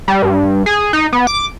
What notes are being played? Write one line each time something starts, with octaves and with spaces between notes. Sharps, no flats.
G3
G2
G#4
D#4
B3
D6